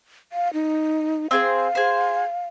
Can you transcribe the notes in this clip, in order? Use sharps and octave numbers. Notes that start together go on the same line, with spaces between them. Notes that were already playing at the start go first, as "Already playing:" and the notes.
F5
D#4
C4 G#4 C5 F5
G#4 C5